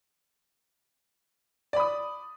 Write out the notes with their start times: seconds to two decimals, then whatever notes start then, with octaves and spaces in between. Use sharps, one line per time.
1.73 D5
1.76 B5
1.80 D#6